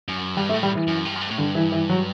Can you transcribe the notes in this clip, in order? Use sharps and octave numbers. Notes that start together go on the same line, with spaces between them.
F#2
G2 G3
A3
A2
G3
E3
F#2
G2
F#2
G2
A2
G2 D3
E3
E3
F#3